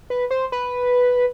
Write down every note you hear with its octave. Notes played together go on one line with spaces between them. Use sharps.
B4
C5
B4